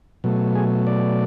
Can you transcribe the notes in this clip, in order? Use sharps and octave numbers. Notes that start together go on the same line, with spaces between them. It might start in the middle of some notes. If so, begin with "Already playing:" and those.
B2 F#3 A3
G#4
D5